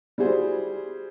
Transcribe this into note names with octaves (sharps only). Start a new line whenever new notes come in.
G3 E4 F#4 G#4 C5